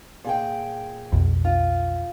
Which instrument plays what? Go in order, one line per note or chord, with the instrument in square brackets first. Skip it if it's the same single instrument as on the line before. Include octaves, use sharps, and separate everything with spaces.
[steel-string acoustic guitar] A#2 G#4 G5
[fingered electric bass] B1 F2
[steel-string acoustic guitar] F4